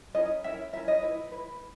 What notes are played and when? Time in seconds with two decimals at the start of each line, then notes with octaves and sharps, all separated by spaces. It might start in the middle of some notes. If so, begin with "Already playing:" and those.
0.15 C#4 E4 A#4 D#5
0.44 C#4 E4 A#4 E5
0.73 C#4 E4 A#4 E5
0.88 D#5
1.02 E4 B4
1.32 E4 B4